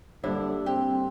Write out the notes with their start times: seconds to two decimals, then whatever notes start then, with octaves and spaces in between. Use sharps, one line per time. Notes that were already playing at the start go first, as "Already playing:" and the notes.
0.24 G2 D3 G3 A#3 D4 E4 C5
0.66 C4 G4